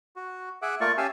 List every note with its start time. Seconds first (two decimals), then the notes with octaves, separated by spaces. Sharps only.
0.16 F#4
0.62 G#4 E5 F#5 D6
0.81 A3 A#3 F4 D5 C#6
0.98 C#4 G4 E5 F5 G#5 A5